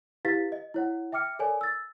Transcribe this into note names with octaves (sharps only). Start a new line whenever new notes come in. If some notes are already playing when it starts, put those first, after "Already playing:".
E4 G4 B4 F5 A6 B6
D#5
E4 C#5 F#5
E5 G5 D6 F6 C#7
A4 A#4 C#5 D5 G#5
E6 A6